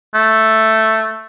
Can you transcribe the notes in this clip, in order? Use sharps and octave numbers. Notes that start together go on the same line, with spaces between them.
A3